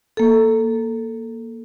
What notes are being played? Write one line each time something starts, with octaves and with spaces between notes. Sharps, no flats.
A#3 A4